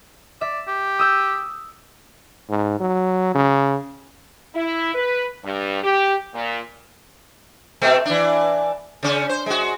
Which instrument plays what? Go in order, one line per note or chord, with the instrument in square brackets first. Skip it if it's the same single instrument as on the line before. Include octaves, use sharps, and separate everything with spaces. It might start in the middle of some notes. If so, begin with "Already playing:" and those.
[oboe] D5 [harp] E5
[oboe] G4
[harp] D#6 E6 G6
[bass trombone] G#2
F#3
C#3
[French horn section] E4
B4
G2
G4
A#2
[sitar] B2 A3 C4
E3 D4
C#3 C#4
C5
G#3 F#4